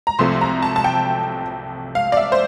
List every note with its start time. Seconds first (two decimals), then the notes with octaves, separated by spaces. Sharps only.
0.07 A#5
0.19 C2 C3 F3 A3 C6
0.41 A#5
0.62 A5
0.76 A5
0.84 G5
1.95 F5
2.12 D5
2.17 E5
2.32 C5